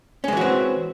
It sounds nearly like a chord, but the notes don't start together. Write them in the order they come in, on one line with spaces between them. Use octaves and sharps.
C#4 G#3 E3 F#4 C4